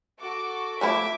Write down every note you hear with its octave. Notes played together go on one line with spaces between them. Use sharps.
F#4 A4 D6
F3 A3 E4 E5 D6